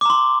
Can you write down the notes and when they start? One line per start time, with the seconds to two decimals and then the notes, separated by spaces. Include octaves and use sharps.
0.01 D6
0.05 A#5
0.10 C6